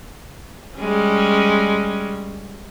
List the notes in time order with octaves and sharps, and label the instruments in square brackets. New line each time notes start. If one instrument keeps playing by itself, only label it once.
[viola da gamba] G3 G#3 C#4